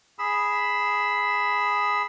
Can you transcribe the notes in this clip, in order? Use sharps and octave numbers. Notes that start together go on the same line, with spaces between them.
G#4 B5 E6